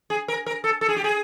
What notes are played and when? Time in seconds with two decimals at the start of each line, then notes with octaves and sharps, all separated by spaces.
0.10 G#4
0.28 A#4
0.46 A#4
0.64 A4
0.81 A4
0.89 G#4
0.96 G4
1.04 G#4